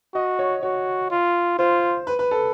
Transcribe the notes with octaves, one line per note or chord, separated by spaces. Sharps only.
F#4 D#5
C#5
F#4 C#5
F4
F4 C5
B4
B4
A4